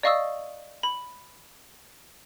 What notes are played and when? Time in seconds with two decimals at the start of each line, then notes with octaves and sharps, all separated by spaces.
0.03 D5 D#5 F5 C#6 D#6 E6
0.83 B5